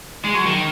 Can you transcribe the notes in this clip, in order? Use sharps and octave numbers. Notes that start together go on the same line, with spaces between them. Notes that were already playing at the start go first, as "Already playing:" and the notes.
G#3
F#3
D#3